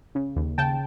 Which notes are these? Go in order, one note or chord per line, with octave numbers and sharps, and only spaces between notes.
C#3
D#2
C#3 G5 A5